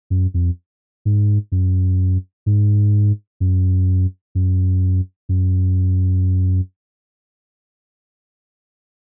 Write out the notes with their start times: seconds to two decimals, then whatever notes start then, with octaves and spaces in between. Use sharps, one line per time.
0.10 F#2
0.34 F2
1.05 G#2
1.52 F#2
2.46 G#2
3.40 F#2
4.35 F#2
5.29 F#2